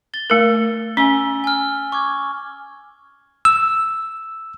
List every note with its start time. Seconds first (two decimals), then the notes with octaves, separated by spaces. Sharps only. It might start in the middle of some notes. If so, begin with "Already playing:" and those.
0.14 A6 G7
0.30 A3 A#4
0.97 C#4 G#5 E6 G7
1.44 G#5 F6
1.92 C#6 D6 G#6
3.45 E6